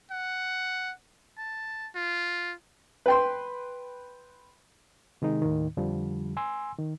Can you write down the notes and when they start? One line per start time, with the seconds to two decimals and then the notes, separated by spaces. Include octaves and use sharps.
0.11 F#5
1.38 A5
1.95 F4
3.06 B4 G5 C6
5.22 C3 D#3 G#3 D#4
5.42 D#2 A2 D#3
5.77 F2 D3 F3 G3
6.37 G#5 C6 E6
6.79 D#3